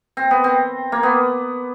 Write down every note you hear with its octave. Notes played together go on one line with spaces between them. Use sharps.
C4
B3
C4
A#3
B3